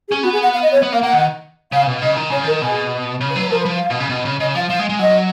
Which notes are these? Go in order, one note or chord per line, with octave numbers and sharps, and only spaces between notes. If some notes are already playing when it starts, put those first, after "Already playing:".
G#4
C#4
B3 F#4
G#4
F#5
F5
D#5
C#5
B3
A#3 F5
A#3 F#5
D#3
C#3 F5
B2
C#3 D#5
D#3
C#3 C#5
D#3 A#4
B2 G#4
C#3
B4
F#3
B4
F3 A#4
B4
F3
F5
B2
C#3
B2
C#3
C#3 D#5
F3 F5
F3 F5
G#3
G#3
F#3 D#5